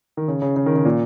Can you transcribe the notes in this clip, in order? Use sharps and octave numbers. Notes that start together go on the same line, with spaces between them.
D#3
C#3
C#3
C#3
D#3
C#3
A#2